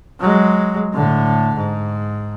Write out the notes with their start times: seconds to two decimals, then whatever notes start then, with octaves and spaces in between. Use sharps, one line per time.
0.20 F#3 G#3
0.94 A2 D3
1.56 G#2